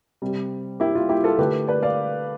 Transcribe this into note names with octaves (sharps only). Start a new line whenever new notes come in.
C3 G3
E4 G4
F4
E4 G4
F4 A4
D3 A3 G4 B4
B4 D5
D5 F5